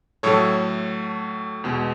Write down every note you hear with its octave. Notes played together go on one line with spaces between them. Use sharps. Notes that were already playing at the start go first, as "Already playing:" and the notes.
A2 F#3 A3 A4 C#5
E2 B2 G#3